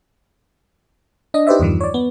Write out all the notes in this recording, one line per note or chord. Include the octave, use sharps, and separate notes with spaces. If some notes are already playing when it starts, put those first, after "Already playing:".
D4 D#5
D#4 G4 B4 C5 D5 E5
E2 G2 D#3 F3
C#5 D5
B3